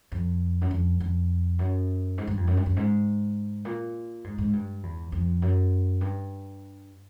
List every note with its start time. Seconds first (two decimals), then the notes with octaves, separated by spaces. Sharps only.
0.12 F2
0.61 F#2
0.71 F2
1.00 F2
1.59 F#2
2.18 G#2
2.27 G2
2.37 F2
2.47 F#2
2.57 G2
2.66 F#2
2.77 G#2
3.65 A#2
4.24 G#2
4.38 G#2
4.53 G2
4.83 E2
5.12 F2
5.42 F#2
6.01 G2